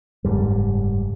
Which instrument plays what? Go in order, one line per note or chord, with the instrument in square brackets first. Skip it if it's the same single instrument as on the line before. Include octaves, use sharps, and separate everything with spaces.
[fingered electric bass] F#1 G#2 G3